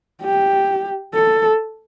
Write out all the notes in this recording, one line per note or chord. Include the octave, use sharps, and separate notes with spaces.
G4
A4